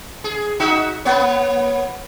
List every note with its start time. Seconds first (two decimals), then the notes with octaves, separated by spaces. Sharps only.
0.24 G#4
0.60 D#4 F#4 E5
1.05 A#3 B3 C#5